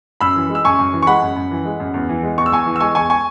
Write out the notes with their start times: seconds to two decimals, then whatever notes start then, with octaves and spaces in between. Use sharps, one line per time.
0.21 F#2 B5 E6
0.36 E3
0.50 G#3
0.55 E6
0.65 F#2 G#5 C#6
0.79 F#2
0.93 E3
1.02 C#6
1.07 G#3 F#5 B5
1.22 F#2
1.36 F#2
1.51 E3
1.65 G#3
1.80 F#2
1.94 E2
2.09 E3
2.23 G#3
2.38 E2 C#6
2.46 E6
2.52 E2 G#5 C#6
2.66 E3
2.76 E6
2.80 G#3 G#5 C#6
2.95 E2 G#5 C#6
3.10 G#5 C#6